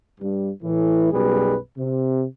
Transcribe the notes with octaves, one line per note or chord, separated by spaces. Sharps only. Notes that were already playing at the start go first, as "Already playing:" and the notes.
G2
A2 E3
B1 F#2 B2 G3 G#4 B4
C3